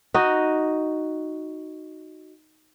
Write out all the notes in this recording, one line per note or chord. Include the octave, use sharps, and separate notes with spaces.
D#4 F#4 D#5